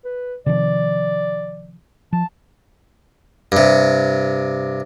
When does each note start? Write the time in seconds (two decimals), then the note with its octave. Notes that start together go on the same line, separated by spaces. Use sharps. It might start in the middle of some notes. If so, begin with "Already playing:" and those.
0.05 B4
0.46 C3 D#3 F3 D5
2.13 F3 A5
3.52 G2 C3